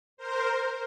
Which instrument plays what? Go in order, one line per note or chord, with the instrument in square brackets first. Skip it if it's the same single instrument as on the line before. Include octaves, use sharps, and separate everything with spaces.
[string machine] A#4 C5